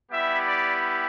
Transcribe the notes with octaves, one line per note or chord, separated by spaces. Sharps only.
G3 B3 E4 G4 E5
D5